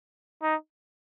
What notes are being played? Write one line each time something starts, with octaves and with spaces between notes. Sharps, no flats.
D#4